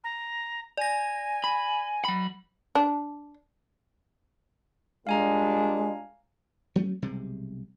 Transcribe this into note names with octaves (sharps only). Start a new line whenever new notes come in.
A#5
D5 G#5 A#6
B5
F#3 B5
D4
A#2 G3 G#3 D4 F5 G#5 A#5
F#3 A3 C#4
B1 C3 G3 G#3